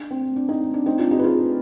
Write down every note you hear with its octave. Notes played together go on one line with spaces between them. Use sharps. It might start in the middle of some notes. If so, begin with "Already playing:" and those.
Already playing: D4
C4
D4
C4 D#4
D4
C4 D#4
D4 F4
D#4 G4
B4
F4 G#4